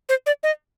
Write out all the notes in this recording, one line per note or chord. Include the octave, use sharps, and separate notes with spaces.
C5
D5
D#5